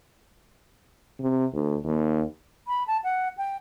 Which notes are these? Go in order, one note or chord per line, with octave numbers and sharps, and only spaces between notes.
C3
D2
D#2
B5
A5
F#5
G5